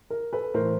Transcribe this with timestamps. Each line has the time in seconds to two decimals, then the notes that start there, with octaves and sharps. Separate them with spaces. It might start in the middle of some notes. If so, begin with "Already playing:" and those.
0.10 A#4
0.33 A4 B4
0.54 A2 E3 A#4 C5